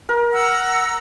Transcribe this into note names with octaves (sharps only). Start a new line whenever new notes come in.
A#4
F#5 A#5 E6